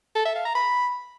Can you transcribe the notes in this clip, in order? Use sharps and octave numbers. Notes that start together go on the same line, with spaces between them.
A4
E5
F5
A#5
B5